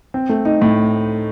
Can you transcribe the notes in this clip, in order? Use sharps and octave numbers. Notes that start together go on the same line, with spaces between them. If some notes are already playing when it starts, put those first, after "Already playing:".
C4
A3
D#4
A2